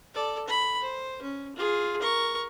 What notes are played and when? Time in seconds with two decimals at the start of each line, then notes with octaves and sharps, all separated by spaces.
0.14 A4 D5
0.48 B5
0.81 C5
1.22 C#4
1.56 F4 G#4
2.01 A#4 C#6